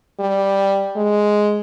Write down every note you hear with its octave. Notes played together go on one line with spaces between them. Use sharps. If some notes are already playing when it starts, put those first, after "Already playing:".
G3
G#3